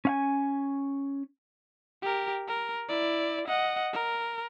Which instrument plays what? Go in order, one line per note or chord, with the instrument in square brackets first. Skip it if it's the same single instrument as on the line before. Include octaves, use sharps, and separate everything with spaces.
[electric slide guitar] C#4 F5 G#5
[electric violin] G4 A#4
A#4
E4 D5
D#5 F#5
A#4